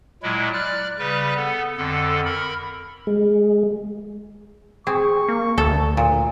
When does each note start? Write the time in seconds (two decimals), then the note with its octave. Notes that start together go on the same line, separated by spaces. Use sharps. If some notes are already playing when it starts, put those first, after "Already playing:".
0.23 A#2 F#3 G#3 E4
0.53 D5 F6 F#6
0.99 C#3 G3 B4 F#6
1.36 B3 A4
1.77 F2 D3 A4
2.25 A#4 B5
3.07 G#3
4.87 C4 G#4 C#6
5.29 A#3
5.58 D2 A4
5.97 A#2